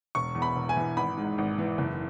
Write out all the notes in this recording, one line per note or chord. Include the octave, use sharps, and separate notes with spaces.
E1 C#6
E2
B5
E1
G#5
E3
G#1 B5
G#2
G#1
E3
F#1